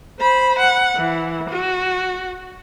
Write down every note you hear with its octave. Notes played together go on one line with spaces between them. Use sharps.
C5 B5
F#5
E3
F#4